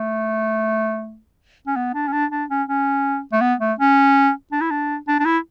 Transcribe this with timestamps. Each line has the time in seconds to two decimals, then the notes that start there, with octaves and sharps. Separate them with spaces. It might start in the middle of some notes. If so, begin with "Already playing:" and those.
Already playing: A3
1.67 C#4
1.76 B3
1.94 D4
2.08 C#4
2.13 D4
2.32 D4
2.50 C#4
2.69 C#4
3.32 A3
3.41 B3
3.60 A3
3.79 C#4
4.52 D4
4.61 E4
4.71 D4
5.08 D4
5.19 D4
5.25 E4